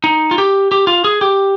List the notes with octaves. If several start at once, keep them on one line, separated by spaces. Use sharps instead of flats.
D#4
F4
G4
G4
F4
G#4
G4